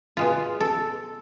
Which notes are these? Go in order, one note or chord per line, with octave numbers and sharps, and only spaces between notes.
B2 G#3 F4
A4